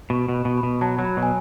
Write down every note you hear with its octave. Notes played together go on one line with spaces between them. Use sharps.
B2 C#6
B2
B5
B2
B5
B2
F#3 A5
F#3
B5
B2
G#5